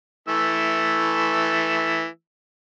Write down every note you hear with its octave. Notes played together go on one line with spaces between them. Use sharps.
E3 A3 E6